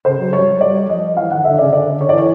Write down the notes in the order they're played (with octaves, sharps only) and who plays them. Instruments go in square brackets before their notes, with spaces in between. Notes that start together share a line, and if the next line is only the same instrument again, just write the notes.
[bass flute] C#3 [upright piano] C5
[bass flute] F#3
[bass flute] G3 [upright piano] C#5
[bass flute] F#3
[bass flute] G3 [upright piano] D5
[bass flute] F3 [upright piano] D#5
[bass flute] E3 [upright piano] F5
[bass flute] D#3 [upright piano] F#5
[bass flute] D3 [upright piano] E5
[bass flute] C#3 [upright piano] D5
[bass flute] D3 [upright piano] D5
[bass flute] D3
[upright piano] C#5
[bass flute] E3 [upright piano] D5
[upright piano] C#5